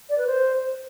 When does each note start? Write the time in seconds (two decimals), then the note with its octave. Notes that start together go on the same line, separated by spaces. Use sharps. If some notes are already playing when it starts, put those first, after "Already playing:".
0.09 D5
0.18 B4
0.27 C5